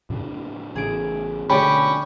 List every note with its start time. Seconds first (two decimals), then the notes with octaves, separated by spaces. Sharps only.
0.10 A2 C#3 D4
0.76 A1 C#3 G#4 D7
1.50 B2 D3 A3 C#4 G4 D5 B5